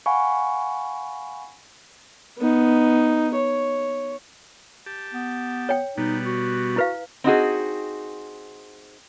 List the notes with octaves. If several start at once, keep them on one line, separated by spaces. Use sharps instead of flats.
F5 F#5 G#5 B5 C#6
B3 D#4
C#5
G4 A5
B3
C#5 G5
B2 G3 B3 D#4
F#4
E4 B4 F5
C4 D#4 F#4 G#4